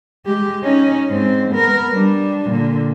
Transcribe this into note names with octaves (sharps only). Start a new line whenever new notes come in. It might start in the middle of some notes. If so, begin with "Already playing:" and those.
G#3 G4
C#4 D#4
G#2 C4
B3 A#4
G3 D4
A#2 D3